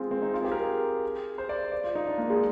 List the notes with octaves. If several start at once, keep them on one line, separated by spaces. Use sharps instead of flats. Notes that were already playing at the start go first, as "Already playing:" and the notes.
Already playing: G#3 C4 F4
C4
D#4
F4
G#4
G4
A#4
G#4
C5
D5
D5
F4
D#4
D4
A#3
G#3